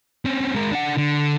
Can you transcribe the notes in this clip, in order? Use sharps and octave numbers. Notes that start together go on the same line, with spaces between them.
C4 C#4
G#3 A#4
D4 F#5
D3